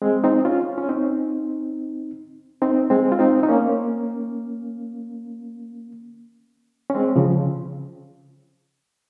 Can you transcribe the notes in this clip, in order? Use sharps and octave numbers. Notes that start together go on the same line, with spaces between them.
G#3 C4
C4 D#4
C#4 F4
C#4
C4 D#4
C4 D#4
G#3 C4
F4
C4 D#4
D#4
A#3 C#4
C#4
G#3 C4
C#3 F3